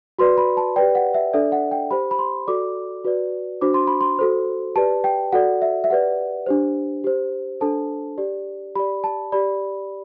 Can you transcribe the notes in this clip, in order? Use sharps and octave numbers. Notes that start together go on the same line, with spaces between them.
F#4 B4 D5 C6
B5
A5
G4 B4 D5 G5
F#5
E5
D4 A4 D5 E5
F#5
G5
G4 C5 B5
B5
C6
F#4 A4 D5 D6
F#4 B4 D5
D4 F#4 C5 D6
C6
B5
C6
F#4 A4 C5
G4 B4 D5 A5
G5
F#4 A4 D5 F#5
E5
E5
G4 B4 D5 F#5
D4 G4 C5
G4 C5
D4 A4 C5 A5
G4 D5
G4 D5 B5
A5
G4 D5 B5